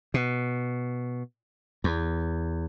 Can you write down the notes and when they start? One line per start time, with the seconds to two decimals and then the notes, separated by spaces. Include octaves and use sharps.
0.14 B2
1.84 E2